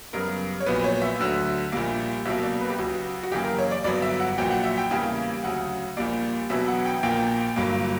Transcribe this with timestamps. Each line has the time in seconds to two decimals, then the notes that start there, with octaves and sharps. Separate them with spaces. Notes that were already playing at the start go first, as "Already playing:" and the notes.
0.13 F#2 C#3 G3 B3 A#4
0.60 C#5
0.66 A#1 A#2 F#3 B3 B4
0.84 C#5
1.02 E5
1.19 D2 D3 F#3
1.72 A#1 A#2 G3 A#3
2.26 C#2 B2 F#3 A#3 E5
2.43 D5
2.61 B4
2.70 G4
2.78 C#2 C#3 F#3 F#4
3.23 F#4
3.32 F#2 C#3 E3 A#3 G4
3.44 A#4
3.58 C#5
3.71 D5
3.84 G1 G2 F#3 B3 D5
4.02 E5
4.20 F#5
4.38 A#1 A#2 F#3 G5
4.51 F#5
4.64 E5
4.78 G5
4.91 E2 C#3 E3 G3 A#3
5.43 D2 C#3 F#3 F#5
5.97 A#1 A#2 G3 A#3 D5
6.50 E1 E2 B2 F#3 B3 E5
6.68 F#5
6.85 G5
7.03 A#1 A#2 A#3 G5
7.56 G1 G2 F#3 A#3